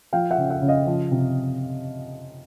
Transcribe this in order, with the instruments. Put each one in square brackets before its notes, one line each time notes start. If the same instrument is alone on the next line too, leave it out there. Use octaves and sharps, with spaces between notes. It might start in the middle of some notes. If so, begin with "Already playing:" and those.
[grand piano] F3 F5 G5
E5 F#5
C#3
E5 F#5
C#3
D#5 F5
F3
C3